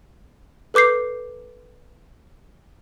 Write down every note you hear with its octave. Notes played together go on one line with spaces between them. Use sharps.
A4 B4 D6 G6 C7